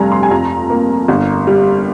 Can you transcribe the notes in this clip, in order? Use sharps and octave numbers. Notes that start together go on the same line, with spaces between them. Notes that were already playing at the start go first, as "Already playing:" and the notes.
Already playing: F1 G2 G3 G#5 A#5
C6
G#5
F2 A#5
A#3
G1
G3